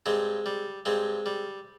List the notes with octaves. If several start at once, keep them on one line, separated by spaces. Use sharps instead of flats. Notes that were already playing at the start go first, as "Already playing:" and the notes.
G2 G#3 C4
G3
G2 G#3 C4
G3